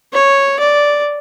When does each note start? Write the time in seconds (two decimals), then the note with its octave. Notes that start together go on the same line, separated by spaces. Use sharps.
0.13 C#5
0.59 D5